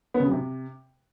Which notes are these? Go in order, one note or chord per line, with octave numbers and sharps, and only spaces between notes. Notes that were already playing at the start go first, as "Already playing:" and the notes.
B3
C#3
F#3
C3